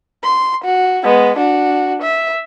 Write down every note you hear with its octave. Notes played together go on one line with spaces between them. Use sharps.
C6
F#4
G#3 B3
D4 F#4
E5